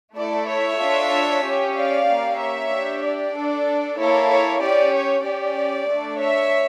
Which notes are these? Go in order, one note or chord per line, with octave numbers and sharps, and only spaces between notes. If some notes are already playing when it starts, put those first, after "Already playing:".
A3 E4 A4 D5
C#5 E5
D4 F4 A4
C#4 G4
D5 F5
A#3 C#4 G4
C#5 E5
D4 G4
D5
D4 A4
A#3 E4 A4 C#5
C#5
C#4 G4 D5
C#5
C#4 G4 D5
A3 D4 A4
C#5 E5